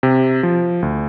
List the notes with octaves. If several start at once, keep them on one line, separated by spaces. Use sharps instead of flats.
C3
F3
D2